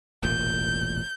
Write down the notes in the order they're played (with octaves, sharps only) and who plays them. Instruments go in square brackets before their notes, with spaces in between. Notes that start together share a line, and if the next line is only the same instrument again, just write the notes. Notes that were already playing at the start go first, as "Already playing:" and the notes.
[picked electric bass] E1 A1 A#2 [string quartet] G6